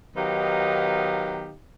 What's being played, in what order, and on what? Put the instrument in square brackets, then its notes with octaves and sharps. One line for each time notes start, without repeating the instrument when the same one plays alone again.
[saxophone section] D#3 F#3 B3 D#4 G4 F5